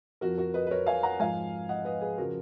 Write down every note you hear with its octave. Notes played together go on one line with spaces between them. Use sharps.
F2 F3 F#4 A#4
F#4 A#4
B4 D#5
B4
A#4 C#5
F5 G#5
F#5 A#5
G#2 F3 F5 G#5
D#5 F#5
B4 D#5
G#4 B4
C#3 F3 F#4 A#4